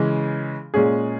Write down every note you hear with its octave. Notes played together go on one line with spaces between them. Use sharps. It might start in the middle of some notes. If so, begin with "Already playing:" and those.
Already playing: C#3 E3 G#3
A#2 G#3 C#4 G#4